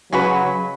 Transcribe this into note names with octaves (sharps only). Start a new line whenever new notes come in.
C#3 F#3 G#3 C#4 F#4 B4